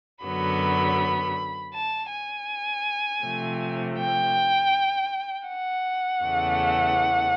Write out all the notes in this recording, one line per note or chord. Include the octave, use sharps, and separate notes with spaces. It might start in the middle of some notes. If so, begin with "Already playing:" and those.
F#2 D3 F#3 B3 B5
A5
G#5
C3 F3 A3
G5
F#5
E2 C#3 E3 A3